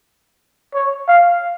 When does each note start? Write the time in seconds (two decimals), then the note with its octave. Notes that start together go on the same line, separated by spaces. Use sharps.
0.75 C#5
1.08 F5